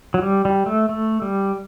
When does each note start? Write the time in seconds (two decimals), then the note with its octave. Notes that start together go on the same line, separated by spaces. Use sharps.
0.14 F#3
0.22 G3
0.45 G3
0.66 A3
0.89 A3
1.22 G3